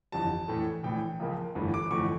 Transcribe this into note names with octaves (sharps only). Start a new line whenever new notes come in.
G1 F2 E3 G3 A5
A#1 A2 E3 A3
A#1 A2 E3 G5
C#2 C#3 F3 A#3
G1 G2 E3 A3
D6
G1 F2 E3 A3 C#6